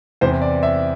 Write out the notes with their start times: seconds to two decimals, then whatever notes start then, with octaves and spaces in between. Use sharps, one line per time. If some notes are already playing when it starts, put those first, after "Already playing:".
0.21 E2 C3 E3 C5
0.42 D5
0.63 E5